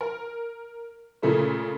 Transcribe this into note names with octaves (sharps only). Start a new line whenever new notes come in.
A#4
A#2 C#3 A3 A#3